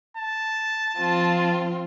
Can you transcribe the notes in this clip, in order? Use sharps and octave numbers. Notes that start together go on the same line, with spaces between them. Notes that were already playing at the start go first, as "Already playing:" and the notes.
A5
F3 C4 F4